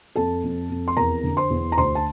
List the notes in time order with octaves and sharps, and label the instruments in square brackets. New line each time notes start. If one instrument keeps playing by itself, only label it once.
[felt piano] F2 A4 A5
F2
F2
C6
E2 A#4 A#5
D3
C5 C6
E2
A#5
D2 C5 C6
A5